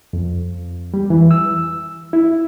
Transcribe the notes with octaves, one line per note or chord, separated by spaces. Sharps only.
F2
G3
E3
E6
E4